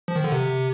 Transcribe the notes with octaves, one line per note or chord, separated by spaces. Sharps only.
F3
D#3
D3
C3